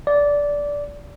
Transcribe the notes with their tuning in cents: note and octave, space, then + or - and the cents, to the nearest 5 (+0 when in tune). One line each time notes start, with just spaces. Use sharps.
D5 -15